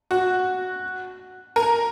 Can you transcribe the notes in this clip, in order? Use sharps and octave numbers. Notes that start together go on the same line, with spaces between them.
F#4
A#4